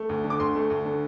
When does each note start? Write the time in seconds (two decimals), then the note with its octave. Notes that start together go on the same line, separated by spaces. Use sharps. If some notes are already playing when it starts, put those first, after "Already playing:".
Already playing: A3
0.09 D2
0.24 D3
0.30 D6
0.40 D2 C6
0.55 A3
0.70 D2
0.85 D3